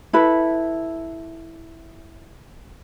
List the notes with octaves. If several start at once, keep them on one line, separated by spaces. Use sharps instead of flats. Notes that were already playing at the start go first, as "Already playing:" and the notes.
E4 A4 B4